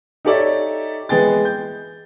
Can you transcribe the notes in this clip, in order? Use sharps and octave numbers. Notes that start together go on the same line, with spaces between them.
D#4 G4 A4 C#5 D5 E5
E3 G#3 B3 G#4 G5 A6
G6